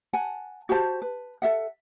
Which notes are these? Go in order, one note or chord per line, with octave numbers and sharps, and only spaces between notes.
F#5 G#5 A5
F#4 G4 C5 A5
B4
A4 E5 F#5